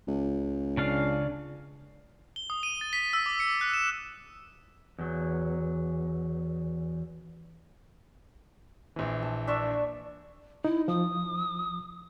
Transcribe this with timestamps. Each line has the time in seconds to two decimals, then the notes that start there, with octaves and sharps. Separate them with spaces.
0.08 C#2
0.77 C#3 D4 F5
2.36 G7
2.50 D#6
2.63 D#7
2.81 A6
2.93 B6
3.13 E6
3.26 D6
3.40 C#7
3.61 F#6
3.74 E7
4.99 E2 F#3
8.96 A#1 E3
9.22 A5
9.47 D4 E5 C#6
10.65 D#4 E4
10.88 F3 D#6